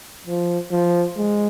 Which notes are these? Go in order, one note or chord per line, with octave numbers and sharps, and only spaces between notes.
F3
F3
G#3